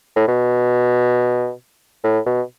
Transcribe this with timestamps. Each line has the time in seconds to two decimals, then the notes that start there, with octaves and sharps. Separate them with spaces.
0.16 A2
0.28 B2
2.03 A2
2.26 B2